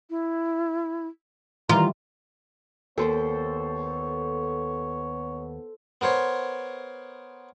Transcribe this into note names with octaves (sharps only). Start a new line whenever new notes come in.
E4
D#3 E3 G3 F4 A#5
D#2 B3 A4 C5 C#5
B3 A#4 C5 C#5